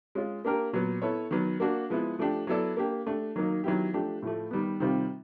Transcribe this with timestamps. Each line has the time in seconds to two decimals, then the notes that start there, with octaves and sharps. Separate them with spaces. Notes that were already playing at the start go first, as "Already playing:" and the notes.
0.15 G#3 C#4 F4
0.45 A#3 D4 G4 A#4
0.73 A#2 F#3 B3
1.02 B3 E4 A4 C#5
1.31 D#3 F#3 B3
1.60 A#3 D4 F#4
1.90 F3 G#3 B3 E4
2.19 F3 A3 D4 G4
2.47 F#3 B3 E4 A4 D5
2.77 A#3 D4 G4
3.07 A3 D4 G4
3.36 D#3 F#3 A#3 D#4
3.64 D#3 F#3 B3 E4 G4
3.93 F3 A3 D4 G4
4.23 A2 F3 A3
4.51 D#3 G3 B3
4.80 C3 D#3 G3 C4 F4